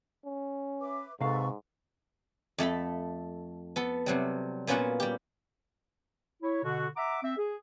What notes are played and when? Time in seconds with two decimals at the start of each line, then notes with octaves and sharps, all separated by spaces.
0.25 C#4
0.81 B4 E5 D6
1.20 G#2 C3 A4 B4 F5 C#6
2.58 F2 A3 A4 B5
3.76 B3 A4
4.06 C3 F#3 G3
4.67 A#2 B3 C#4 F4 F#4 F#5
5.00 G3 G4
6.43 E4 C#5
6.64 B2 D3 F#4
6.97 E5 F#5 A#5 D6
7.23 C4 E5
7.38 G#4